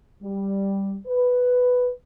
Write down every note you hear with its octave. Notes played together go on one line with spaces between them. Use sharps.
G3
B4